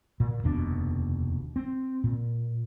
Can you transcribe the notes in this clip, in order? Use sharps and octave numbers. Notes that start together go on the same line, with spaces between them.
A#2
F1 D#2 B2 D4
C4
A#2